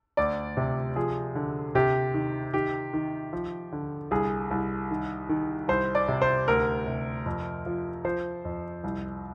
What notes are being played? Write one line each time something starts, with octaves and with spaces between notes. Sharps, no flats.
D2 D5
C3
F3 G#4
D3
C3 G4
D#3
D#3 G4
D#3
F3
D3
C2 G#4
C2
D#3
D#3
C2 C5
D5
C3
C5
D2 A#4
C3
F2
F3
F3 C5
F2
C2